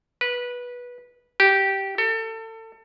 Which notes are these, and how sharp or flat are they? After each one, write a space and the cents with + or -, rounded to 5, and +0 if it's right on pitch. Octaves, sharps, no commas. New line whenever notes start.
B4 -15
G4 -10
A4 +30